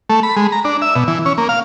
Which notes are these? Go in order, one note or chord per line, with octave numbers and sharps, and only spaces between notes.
A3
B5
G#3
A#5
D4
E5
B2
E3
C#4
A#3
F5